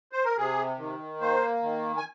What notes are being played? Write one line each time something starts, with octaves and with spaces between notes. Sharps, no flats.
C5
A#4
C3 G#4
D#3
A#3 C5
D#3
G#5